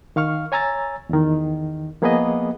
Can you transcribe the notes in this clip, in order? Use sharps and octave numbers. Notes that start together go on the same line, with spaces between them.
D#3 F5 C#6 F6
C#5 G#5 A#5 E6 A6
E2 D#3
F3 A#3 B3 G#4 B4 D#5